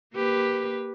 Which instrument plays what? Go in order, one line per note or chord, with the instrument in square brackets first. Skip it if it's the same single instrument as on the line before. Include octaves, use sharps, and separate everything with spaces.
[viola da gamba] A#3 G4 B4